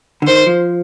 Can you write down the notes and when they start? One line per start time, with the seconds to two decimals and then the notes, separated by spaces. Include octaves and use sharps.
0.22 D3
0.27 D#3 C5
0.46 F3